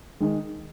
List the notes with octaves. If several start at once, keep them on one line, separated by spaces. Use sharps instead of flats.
D#3 G#3